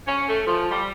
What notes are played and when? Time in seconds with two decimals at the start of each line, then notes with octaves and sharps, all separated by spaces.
0.06 C#4
0.28 A3
0.46 F3
0.70 G3